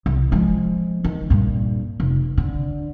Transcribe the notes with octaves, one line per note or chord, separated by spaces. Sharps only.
C2
F3 G#3
D#3
G2 A#2
F1
D3